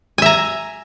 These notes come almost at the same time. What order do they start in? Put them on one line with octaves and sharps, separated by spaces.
G#5 E5 A#5